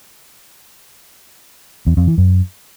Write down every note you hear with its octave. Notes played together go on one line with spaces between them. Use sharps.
E2
F2
E3
F#2